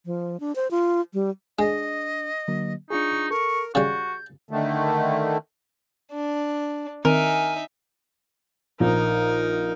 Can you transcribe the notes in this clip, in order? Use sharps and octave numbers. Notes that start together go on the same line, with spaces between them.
F3
D4
C5
F4
G3
G#3 D4 D#5
D3 F#3 A#3
D4 D#4 F4 G#4 C#6
A4 A#4 C#6
C#3 G3 F#4 G6 A6
D3 D#3 A3
D4
D#3 C4 D#4 A#4 E5 G#5
A#1 D#4 A#4